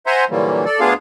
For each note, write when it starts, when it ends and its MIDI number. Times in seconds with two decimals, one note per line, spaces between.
0.06 0.24 72
0.06 0.24 76
0.06 0.24 78
0.06 0.24 80
0.06 0.24 82
0.06 0.24 84
0.30 0.65 46
0.30 0.65 50
0.30 0.65 52
0.30 0.65 54
0.30 0.65 55
0.30 0.65 58
0.65 0.80 69
0.65 0.80 74
0.80 0.94 38
0.80 0.94 59
0.80 0.94 62
0.80 0.94 65
0.80 0.94 68
0.80 0.94 77